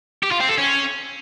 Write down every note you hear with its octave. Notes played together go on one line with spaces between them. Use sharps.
G4
F4
C4
A4
C#4